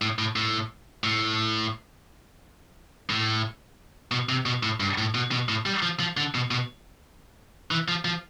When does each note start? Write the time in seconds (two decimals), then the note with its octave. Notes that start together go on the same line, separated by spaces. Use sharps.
0.02 A2
0.19 A2
0.36 A2
1.04 A2
3.10 A2
4.12 B2
4.29 C3
4.46 B2
4.63 A2
4.80 G2
4.98 A2
5.15 B2
5.31 B2
5.49 A2
5.66 G3
5.82 F3
6.00 F3
6.17 D3
6.35 B2
6.51 B2
7.71 E3
7.88 F3
8.05 F3